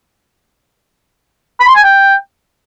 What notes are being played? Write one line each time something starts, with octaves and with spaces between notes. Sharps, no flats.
B5
C6
G#5
G5